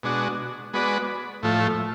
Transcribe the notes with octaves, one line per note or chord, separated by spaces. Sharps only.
B2 G#3 D4 F#4
G#3 B3 F#4 B4 D5
A2 F3 A3